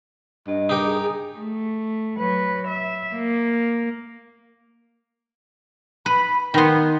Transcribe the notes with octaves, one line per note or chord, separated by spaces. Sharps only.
G2 D#5
D#4 G4 A#4
G#4
G#4
A3
F#3 B4
E5
A#3
B4 B5
D#3 B3 C6